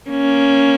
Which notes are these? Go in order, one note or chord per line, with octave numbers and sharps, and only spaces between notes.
A#3 C#4